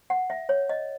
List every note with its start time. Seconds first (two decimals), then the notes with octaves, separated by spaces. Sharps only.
0.10 F#5
0.30 E5
0.49 C#5
0.69 D#5